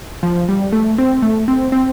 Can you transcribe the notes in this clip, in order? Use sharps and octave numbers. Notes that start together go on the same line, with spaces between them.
F3
G3
A3
C4
A3
C4
C4